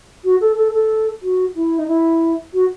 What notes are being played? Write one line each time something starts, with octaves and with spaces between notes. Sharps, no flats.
F#4
A4
A4
A4
F#4
E4
D#4
E4
F#4